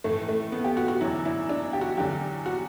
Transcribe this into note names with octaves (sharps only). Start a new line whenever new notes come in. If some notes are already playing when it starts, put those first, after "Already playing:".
A2 E3 A3
A3
B3
G4
F#4
F#4
E2 D3 F#3 E4
E4
D4
G4
F#4
E2 D3 F#3 G4
F#4